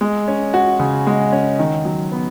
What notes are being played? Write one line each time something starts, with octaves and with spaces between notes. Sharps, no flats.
G#3
C#4
F#4
C#3
G#3
C#4
D#3
F#3
B3